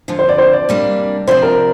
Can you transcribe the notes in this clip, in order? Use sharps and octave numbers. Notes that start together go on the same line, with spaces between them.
F2 D3 F3
C5
D5
C5
D5
C3 G3 A#3 D4
C3 F3 D4 C5
A#4